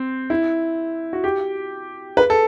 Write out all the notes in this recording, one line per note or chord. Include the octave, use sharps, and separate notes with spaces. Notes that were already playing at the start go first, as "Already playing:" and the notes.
Already playing: C4
E4
F#4
G4
B4
A4